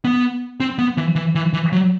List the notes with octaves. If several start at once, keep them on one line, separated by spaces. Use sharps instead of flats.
B3
C4
B3
E3
E3
E3
E3
F#3